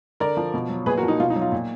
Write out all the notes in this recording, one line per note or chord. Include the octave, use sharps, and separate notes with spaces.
D3 A#4 D5
F3
B2
F#3
A#2 G#4 B4
F#4 A#4
F3
D#4
B2 F4
D#4
F#3
F4
A#2